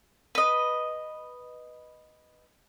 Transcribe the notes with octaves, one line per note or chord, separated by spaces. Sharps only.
B4 D#5